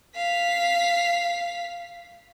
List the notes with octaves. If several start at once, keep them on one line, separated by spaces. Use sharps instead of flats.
F5 B6